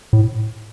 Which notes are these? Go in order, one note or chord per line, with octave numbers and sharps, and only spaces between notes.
A2